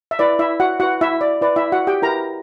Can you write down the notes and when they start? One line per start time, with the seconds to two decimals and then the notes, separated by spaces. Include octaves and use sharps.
0.11 E5
0.19 E4 B4 D5
0.39 E4 E5
0.60 F#4 F#5
0.80 E4 F#4 B4 F#5
1.01 E4 E5
1.21 D5
1.41 E4 B4 D5
1.56 E4 E5
1.72 F#4 F#5
1.87 G4 G5
2.02 E4 A#4 B4 A#5